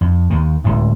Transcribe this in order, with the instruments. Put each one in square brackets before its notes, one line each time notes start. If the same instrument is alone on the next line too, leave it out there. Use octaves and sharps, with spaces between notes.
[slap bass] F2
D#2 D#3
D1 C#2 A2